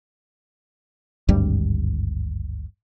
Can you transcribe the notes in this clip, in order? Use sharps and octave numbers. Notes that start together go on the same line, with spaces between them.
G#1 D2 G2 G3